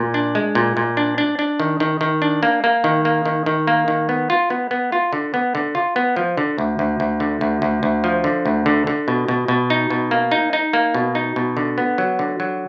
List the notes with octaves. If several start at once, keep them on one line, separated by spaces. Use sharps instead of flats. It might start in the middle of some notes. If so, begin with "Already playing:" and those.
Already playing: A#2
D4
G#3
A#2
A#2
D4
D4
D4
D#3
D#3
D#3
D4
A#3
A#3
D#3
A#3
D#3
D#3
A#3
D#3
B3
F4
B3
B3
F4
D3
B3
D3
F4
B3
F3
D3
D2
D2
D2
D3
D2
D2
D2
F3
D3
D2
D3
D3
B2
B2
B2
D#4
B2
A#3
D#4
D#4
A#3
B2
D#4
B2
D3
B3
F#3
D3
F#3